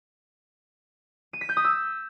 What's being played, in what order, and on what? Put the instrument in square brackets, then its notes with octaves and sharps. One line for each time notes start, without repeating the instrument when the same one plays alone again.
[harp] D#7
B6
G6
D#6
E6